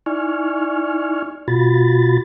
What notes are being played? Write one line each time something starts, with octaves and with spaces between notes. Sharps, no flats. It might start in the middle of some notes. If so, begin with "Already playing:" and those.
D#4 E4 D5 G#5 C#6 F6
B2 F4 F#4 B5 A6